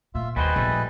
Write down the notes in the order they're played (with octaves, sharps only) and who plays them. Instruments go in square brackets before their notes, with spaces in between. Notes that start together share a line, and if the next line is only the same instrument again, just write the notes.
[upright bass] A#2 [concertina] F4 E5
[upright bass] D#2 [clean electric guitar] G3 F#4 C5 [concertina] G#4 B4 D#5
[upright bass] A#1 [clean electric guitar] G3 A3